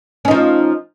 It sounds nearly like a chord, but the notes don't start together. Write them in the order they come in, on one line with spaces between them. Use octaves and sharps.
C#4 D#4 F3